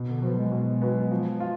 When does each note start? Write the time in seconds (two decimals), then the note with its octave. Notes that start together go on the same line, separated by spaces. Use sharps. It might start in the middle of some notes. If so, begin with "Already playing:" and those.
Already playing: B2
0.08 D3
0.22 F3 F#3 B3
0.37 G#3
0.52 B2
0.82 F#3 B3
1.11 F3
1.40 F4